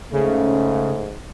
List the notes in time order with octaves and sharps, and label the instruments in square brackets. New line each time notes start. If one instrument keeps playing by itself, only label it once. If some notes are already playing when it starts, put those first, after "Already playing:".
[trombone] G#2 [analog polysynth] C#3 [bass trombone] A3